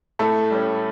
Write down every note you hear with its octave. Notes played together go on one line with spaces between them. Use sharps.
A2 A3 A4
G3 C#4